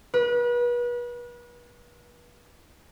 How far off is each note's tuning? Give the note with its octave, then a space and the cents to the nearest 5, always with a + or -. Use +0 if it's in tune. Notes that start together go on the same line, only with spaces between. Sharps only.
B4 -35